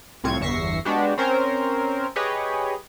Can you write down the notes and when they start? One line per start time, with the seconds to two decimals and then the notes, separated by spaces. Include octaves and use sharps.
0.24 C2 A2 C4 F4 C#6 G#6
0.40 G1 E2 E5 C#6 A#6 C7
0.85 G#3 B3 D4 F#4 G4
1.18 C4 C#4 A#4 C5 C#5
2.16 G4 G#4 B4 C#5 D#5